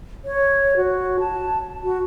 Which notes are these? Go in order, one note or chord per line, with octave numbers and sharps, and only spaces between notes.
C#5
F#4
A5
F#4